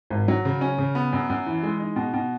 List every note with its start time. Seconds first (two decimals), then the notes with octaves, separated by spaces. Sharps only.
0.11 G#1
0.28 F#3
0.45 C#3
0.61 C#4
0.78 C#3
0.95 B3
1.13 F#2
1.30 F#2
1.46 E3
1.63 G#3
1.80 D#4
1.96 B2
2.14 B2